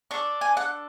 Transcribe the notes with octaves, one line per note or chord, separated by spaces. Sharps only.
D4 A4 C#6
G#5
F#5